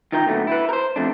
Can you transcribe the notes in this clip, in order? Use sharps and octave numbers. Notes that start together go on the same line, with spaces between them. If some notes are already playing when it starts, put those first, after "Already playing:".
D#3 F4 A#4 G5 A#5
A#2 D3 F#3 A3 B3
E4 B4
A#4 C5
F2 A3 D4